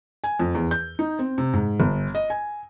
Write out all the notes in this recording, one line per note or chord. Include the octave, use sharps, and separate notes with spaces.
G#5
F2
E2
G6
D#4
C4
C3
G#2
G1
D#5
G#5